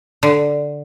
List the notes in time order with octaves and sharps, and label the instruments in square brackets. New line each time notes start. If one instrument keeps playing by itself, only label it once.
[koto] D3